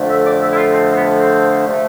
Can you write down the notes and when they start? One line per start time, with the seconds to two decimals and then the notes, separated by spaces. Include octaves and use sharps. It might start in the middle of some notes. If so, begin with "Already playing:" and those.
Already playing: F2 D3 F3 A3
0.09 E5
0.25 D5
0.41 E5
0.51 E4
0.56 F4
0.71 C4
0.91 C4
0.94 B3
1.19 C4
1.67 C3 F3 A3